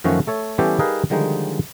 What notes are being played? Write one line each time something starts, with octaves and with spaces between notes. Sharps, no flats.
F#2 D#3 F3 A3 C#4 F#4
A3 A4 C#5
E3 G3 B3 C#4 G4 A4
G3 D#4 G#4 A#4 B4 F5
D3 D#3 F3 G3 G#3 D#4